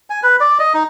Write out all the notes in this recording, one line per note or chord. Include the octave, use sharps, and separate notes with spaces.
G#5
B4
D5
D#5
D#4